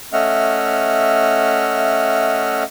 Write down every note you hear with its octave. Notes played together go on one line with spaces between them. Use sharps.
A3 C#4 D#5 E5 F#5 F6